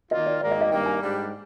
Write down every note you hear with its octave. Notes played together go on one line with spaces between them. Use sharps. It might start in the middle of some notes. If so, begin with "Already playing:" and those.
D#3 A#3 F4 D#5
D5
G#2 D#3 A#3 D5
D#5
D#5
G2 D#3 A#3 G5
G#5
G#2 G3 D4 G4